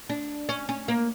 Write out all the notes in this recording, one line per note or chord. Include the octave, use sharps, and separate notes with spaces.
D4
C#4
C#4
A#3